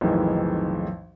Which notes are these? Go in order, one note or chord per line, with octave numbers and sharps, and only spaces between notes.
B1 F2 A2 D#3 E3 G#3